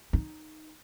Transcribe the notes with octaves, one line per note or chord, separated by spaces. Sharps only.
D#4